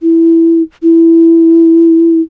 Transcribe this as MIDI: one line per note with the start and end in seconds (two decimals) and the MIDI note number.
0.02 0.62 64
0.83 2.21 64